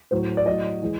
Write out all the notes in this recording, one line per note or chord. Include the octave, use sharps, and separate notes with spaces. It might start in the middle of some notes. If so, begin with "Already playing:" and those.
A2 F#3 C5
D5
A2 F#3 D#5
E3 G#3